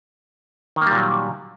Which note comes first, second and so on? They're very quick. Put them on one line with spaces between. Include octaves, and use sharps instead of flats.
D#3 A#3 G3 A#2 F#3